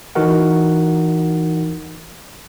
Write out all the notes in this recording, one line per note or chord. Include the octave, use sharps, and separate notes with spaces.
E3 D#4 F#4 A#4 F#5